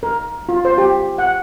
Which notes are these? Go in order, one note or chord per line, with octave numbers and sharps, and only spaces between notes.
A#4
F4
C5
G4
F#5